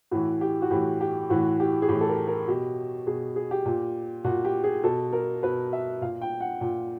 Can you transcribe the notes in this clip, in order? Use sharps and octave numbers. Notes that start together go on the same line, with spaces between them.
A2 E3 F#4
G4
F#4
A2 E3 G4
G4
A2 E3 F#4
G4
G#4
A2 E3 G4
A4
A#4
A#4
B2 G4
B2 G#4
G#4
G4
A#2
A#2 F#4
G4
G#4
B2 A4
A#4
B2 B4
E5
A#2 F5
G5
F#5
A#2